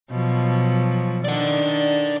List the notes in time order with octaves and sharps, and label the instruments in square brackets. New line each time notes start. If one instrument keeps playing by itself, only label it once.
[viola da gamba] B2 F3 F#3
[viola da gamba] D#3 D4 [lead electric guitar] D5 F#5